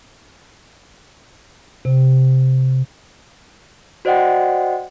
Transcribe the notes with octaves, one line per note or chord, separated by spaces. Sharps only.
C3
F#4 C5 D5 D#5 F#5 G5